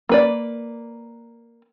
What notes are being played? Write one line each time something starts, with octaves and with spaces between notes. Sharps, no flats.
A#3 B4 D5